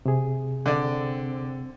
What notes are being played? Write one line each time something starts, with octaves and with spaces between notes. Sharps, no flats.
C3 G#4
D3 C4 D5